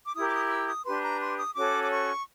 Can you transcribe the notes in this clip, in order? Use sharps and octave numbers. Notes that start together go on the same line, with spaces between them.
D6
E4 G4 A#4 D#6
D6
D#6
D#6
E6
D#6
D4 G4 B4 C6
A#5
C6
D#6
C#4 F#4 A4 C#5 D6
D6
C#6